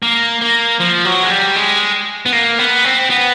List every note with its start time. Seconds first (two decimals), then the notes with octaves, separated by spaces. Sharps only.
0.03 A#3
0.41 A#3
0.80 F3
1.05 F#3
1.23 G#3
1.31 G3
1.56 G#3
2.26 B3
2.33 A#3
2.59 B3
2.84 C4
3.10 B3